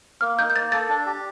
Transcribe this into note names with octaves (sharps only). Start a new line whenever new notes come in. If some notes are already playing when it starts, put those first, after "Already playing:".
A#3 F6
D#4 G6
G6
A#3 A6
A4 A6
D4
G4